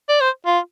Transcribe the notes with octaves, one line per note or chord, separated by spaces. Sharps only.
D5
C5
F4